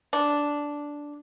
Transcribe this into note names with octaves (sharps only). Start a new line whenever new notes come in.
D4